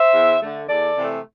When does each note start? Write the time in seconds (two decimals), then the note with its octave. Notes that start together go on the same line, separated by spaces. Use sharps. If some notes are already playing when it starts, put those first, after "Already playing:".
Already playing: C5 E5
0.14 E2
0.42 D3 A3
0.69 E2 A4 D5
0.97 C3 E3 A3